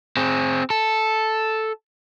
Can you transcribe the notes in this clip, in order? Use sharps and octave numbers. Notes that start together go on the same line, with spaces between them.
C4 G#4
A4